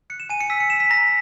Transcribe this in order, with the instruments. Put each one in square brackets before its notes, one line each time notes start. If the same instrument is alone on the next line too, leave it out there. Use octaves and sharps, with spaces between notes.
[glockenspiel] F#6 C#7
E7
G#5 D#7
C#7
E6 B6
C#7
E6 E7
B6
A#5 A#6